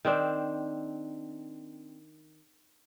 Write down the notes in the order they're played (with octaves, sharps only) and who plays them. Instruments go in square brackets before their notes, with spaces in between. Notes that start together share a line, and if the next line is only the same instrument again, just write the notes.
[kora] D#3 C4 D4